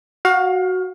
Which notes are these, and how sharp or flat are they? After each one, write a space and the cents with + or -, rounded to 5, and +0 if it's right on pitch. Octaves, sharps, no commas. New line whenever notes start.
F#4 +0 F5 +25